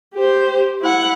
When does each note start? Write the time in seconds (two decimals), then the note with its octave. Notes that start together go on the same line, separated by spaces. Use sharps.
0.14 G4 C5
0.81 E4 F#5